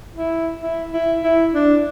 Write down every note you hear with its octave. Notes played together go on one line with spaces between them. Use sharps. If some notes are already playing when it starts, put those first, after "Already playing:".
E4
E4
E4
E4
D4